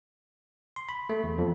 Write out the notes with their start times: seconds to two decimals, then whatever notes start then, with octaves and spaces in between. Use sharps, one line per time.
0.76 C6
0.89 B5
1.09 A3
1.24 E2
1.38 F2